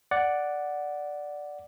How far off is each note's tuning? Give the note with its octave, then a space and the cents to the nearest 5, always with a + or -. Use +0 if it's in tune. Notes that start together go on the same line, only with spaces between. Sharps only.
D5 +0 F#5 +0